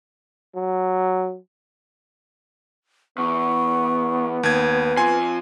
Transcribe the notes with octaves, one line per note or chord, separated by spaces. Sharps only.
F#3
E2 B3 C#6
D#2 B4 G#6
F3 C4 G#5